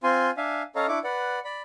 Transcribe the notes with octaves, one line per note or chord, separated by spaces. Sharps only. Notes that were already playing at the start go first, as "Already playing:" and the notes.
C4 F4 G#5 C6
D4 E5 F5 G#5
C#4 A4 C#5 D#5 F5 A#5
D4 E4 C#6 D6
B4 D5 F#5
D5 B5